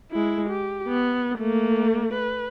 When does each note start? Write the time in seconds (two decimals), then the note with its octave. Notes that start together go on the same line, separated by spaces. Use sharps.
0.12 G#3 E4
0.49 G4
0.88 B3
1.38 A3 A#3
2.14 B4